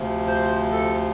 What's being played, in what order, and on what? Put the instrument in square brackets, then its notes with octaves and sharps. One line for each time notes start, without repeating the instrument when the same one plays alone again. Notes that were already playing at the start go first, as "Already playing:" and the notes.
Already playing: [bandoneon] D2 C3 F3
C5
A4